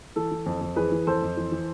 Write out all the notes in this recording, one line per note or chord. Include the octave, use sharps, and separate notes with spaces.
E3 A4
E3
F2
F2
E3 G#4 B4
E3
F2 A4 C5
F2
E3
E3